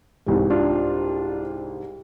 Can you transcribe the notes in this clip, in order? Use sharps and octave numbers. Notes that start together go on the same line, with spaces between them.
C2 G#2
D4 F4